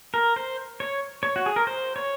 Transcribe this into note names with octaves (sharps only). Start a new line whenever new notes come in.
A#4
C5
C#5
C#5
F#4
G#4
A#4
C5
C#5